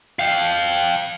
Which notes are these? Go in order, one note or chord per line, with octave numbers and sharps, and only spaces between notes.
F5 G5